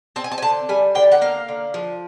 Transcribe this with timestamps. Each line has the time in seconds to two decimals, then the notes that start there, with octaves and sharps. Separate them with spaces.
0.16 C4 A5
0.24 G#5
0.32 A5
0.38 G#5
0.42 D3 A5
0.69 G3 G#5
0.95 D3 G5
1.11 F#5
1.21 A#3 F5
1.49 D3
1.74 F3